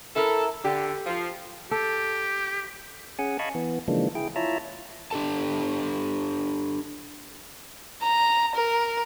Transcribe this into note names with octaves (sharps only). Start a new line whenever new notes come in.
E4 A4 A#4
D3 G4
F3
G4 A4
C#4 G#4 F#5 G#5
D#5 F5 G#5 A5 B5 C#6
E3 B3
C#3 E3 F3 G#3 A#3 D4
E4 G#4 G5
E4 F4 C#5 E5 A5 A#5
D4 G4 A4 A5
A#5
A#4